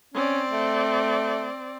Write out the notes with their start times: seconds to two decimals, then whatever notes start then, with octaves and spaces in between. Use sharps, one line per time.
0.14 C4 C#4 D5
0.51 A3